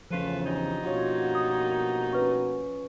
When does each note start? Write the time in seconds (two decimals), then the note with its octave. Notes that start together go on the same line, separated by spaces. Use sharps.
0.11 E2 C#3 F3 A3 C#4 F4 B4
0.44 G2 D#4
0.84 B2 A#3 F4 F#4 C#5
1.35 D#6
2.13 C#4 B4 C#6